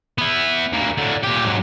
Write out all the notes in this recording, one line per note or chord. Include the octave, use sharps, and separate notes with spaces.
B3 E4
D2 A#3
A2 D3
A#2 G4
G#2 F#3